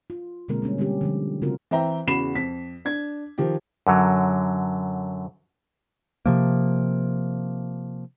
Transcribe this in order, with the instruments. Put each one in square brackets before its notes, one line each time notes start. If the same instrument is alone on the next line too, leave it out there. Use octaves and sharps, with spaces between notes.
[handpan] F4
B2 D3 G#3 A#3 C4 A#4
G3 A#3 C#4
D3 G3 C4 C#4 G4
D3 F3 G3
C#3 A3 C4 F4 F#4 A#4
[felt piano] E3 C4 E5 G5 A#5
E2 C#3 F#4 B5 C7 E7
F2 B6
D4 G#6
D#3 F3 D#4 G4
[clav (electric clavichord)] F#2 D3 F#3
[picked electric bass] C3 F3 A#3